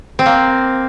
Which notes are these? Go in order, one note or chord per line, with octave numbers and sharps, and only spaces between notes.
C4
A#3